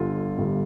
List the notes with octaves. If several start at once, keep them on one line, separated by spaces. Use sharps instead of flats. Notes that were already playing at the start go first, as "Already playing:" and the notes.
Already playing: G1 G2 D3 F4
G1 G2 D3